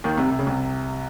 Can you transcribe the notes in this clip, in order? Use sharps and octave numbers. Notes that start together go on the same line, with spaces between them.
D#2 D#3
C2 C3
C3
C#3
C2 C3